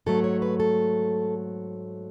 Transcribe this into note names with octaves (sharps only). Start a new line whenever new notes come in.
G#2 F#3 A3 A4
C#5
B4
A4